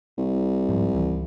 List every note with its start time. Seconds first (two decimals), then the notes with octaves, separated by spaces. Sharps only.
0.18 C2
0.69 G#2 F3
0.94 C#2 E3